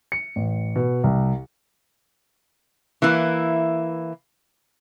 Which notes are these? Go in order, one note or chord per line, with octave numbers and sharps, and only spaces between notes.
C#7
A1
B2
C2
E3 A#3 E4